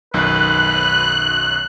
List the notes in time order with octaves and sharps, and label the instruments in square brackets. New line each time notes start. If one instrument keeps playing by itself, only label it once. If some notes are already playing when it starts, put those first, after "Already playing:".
[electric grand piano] B1 F#2 D#3 [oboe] B4 [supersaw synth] F#6